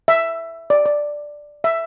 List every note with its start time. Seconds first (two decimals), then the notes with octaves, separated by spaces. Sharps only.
0.08 E5
0.70 D5
0.86 D5
1.64 E5